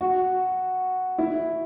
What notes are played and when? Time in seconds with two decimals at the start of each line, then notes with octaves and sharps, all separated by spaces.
0.01 F#4
1.18 E4